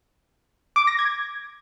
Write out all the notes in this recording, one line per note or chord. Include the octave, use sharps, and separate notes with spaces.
D6
A#6
G#6